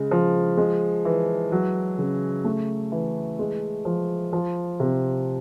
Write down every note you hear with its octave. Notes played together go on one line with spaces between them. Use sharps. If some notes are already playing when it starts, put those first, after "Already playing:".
Already playing: C#3 G#3
F3
G#3
E3
F#3
C#3
A3
E3
G#3
F3
F3
C3